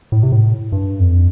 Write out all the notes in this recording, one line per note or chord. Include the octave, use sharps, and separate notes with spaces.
A2
C3
A2
G2
F2